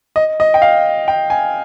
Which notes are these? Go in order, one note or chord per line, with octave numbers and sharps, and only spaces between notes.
D#5
D#5
G5
F5
G5
G#5